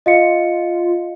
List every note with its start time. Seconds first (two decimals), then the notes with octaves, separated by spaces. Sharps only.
0.06 F4 D#5 F5 C#7